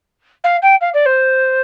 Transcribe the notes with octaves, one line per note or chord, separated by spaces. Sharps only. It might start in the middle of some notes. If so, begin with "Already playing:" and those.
F5
G5
F5
D5
C5